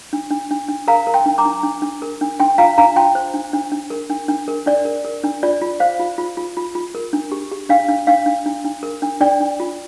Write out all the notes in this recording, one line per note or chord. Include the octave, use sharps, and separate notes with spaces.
D4
D4
D4
D4
A#4 F5 A#5
A#4
G5 C6
D4
A#5 D6
D4
D4
D4
A#4
D4
D4 G5 C6
F4 F5 A#5
D4 F5 A#5
F4 G5 C6
C5
D4
D4
D4
A#4
D4
D4
A#4
D4 D5
A#4
A#4
D4
F4 D5
F4
C5 F5
F4
F4
F4
F4
F4
A#4
D4
G4
G4
D4 F5
D4
D4 F5
D4
D4
D4
A#4
D4
D4 D5 G5
D4
F4